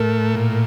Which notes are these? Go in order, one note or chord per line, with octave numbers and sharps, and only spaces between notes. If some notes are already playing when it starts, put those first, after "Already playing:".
Already playing: A2 A3 A#4
A#2